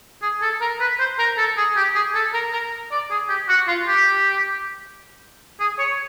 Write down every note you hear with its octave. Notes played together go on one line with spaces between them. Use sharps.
G#4
A4
A#4
B4
C5
A#4
A4
G#4
G4
G#4
A4
A#4
A#4
D5
G#4
G4
F#4
F4
G4
G#4
C#5